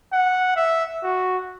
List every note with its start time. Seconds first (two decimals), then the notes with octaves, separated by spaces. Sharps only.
0.13 F#5
0.56 E5
1.03 F#4